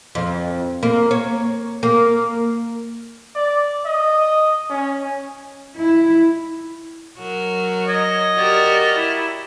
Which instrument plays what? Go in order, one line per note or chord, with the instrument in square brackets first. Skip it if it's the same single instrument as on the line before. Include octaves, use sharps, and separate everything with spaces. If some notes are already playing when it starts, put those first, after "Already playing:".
[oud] F2
A#3
C#5
A#3
[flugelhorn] D5
D#5
C#4
[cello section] E4
[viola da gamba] F#3 F#4 A#4
[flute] C#5 [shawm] D#5
[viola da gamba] F#4 G4 A#4 [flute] D5
[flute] E4